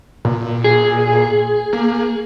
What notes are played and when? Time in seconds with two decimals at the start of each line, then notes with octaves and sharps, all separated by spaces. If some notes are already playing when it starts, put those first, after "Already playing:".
0.25 A#2
0.64 G#4
1.73 A#3